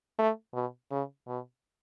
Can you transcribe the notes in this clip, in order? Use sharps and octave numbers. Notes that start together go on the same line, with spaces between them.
A3
B2
C#3
B2